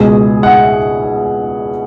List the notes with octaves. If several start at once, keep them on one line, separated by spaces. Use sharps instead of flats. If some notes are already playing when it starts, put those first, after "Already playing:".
Already playing: C#2 B2 G#3 G#4
F#5